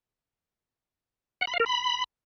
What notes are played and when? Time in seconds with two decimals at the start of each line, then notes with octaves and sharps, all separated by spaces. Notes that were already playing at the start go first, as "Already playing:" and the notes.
1.41 F#5
1.47 B5
1.54 F5
1.60 A#4
1.66 B5